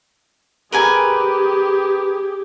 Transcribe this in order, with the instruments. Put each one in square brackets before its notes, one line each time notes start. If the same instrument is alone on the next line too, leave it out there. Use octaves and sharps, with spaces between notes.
[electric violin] G4 G#4 [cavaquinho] A#4 B4 G#5